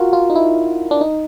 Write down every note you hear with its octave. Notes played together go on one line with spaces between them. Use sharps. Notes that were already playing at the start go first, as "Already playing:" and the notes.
Already playing: F4 F#4 A#4
F4
D#4
E4
D4
D#4